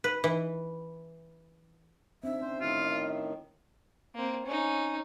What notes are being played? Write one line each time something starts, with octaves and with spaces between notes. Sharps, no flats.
B4
E3
C4 D4 D#4 E5
C#4 C5
A2 D#3 D4 F4 F#4
A#3 C4
C#4 D#4